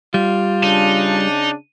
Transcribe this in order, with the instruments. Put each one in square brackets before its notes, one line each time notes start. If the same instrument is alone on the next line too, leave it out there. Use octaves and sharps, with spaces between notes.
[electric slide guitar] G3 [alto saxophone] F4
[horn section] C#3 D4 [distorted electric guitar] D#4